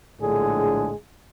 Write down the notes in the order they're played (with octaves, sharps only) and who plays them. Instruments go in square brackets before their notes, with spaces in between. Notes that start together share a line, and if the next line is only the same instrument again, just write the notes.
[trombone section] A#1 A2 D3 G#3 G#4